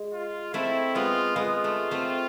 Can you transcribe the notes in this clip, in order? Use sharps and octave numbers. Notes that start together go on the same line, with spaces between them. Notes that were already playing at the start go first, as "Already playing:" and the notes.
Already playing: G#3
F4
A3 C4 E4
G#3 B3 F4
G#3 B3 F4
A3
A3 C4